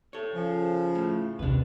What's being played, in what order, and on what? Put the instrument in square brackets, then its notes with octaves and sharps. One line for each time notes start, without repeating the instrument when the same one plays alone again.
[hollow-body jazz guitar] A4 C#5
[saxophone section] C#3 F3
[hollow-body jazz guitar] A2
[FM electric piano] A#1 D#2 C3 [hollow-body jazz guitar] D4 B4